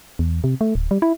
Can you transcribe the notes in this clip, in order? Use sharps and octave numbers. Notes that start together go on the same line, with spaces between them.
E2
C3
A3
D1
G3
E4